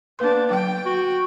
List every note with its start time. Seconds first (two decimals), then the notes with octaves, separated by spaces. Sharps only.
0.19 A#3 B3 D4 B4 C6
0.51 F#3 G5
0.86 F#4